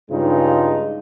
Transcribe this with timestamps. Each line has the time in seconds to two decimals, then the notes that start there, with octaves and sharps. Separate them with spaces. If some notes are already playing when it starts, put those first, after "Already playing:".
0.11 G2 C#3 G#3 D#4 F4